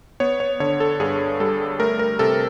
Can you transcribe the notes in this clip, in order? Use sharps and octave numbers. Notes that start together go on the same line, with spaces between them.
B3 C#5
C#5
D3 C#5
A4
G2 G#4
G3 A4
A3 A#4
A#4
C3 A4